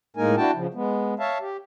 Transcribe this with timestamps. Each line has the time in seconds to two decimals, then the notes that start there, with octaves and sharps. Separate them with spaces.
0.16 A2 G#3 A#3 D#4 A#4 G#5
0.37 D4 E4 F#4 G5 A5
0.55 C#3 F3
0.74 G#3 B3
1.19 C#5 E5 F5 A5
1.40 G4